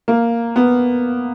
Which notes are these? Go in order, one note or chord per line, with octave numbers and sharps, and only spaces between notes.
A#3
B3